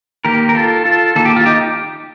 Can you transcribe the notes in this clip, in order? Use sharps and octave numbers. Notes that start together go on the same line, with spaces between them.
D#3 A#3 G4 A#4
A#4
F4 A4
F4 A4
D#3 A#3 A4
G4
F4
D#4 G4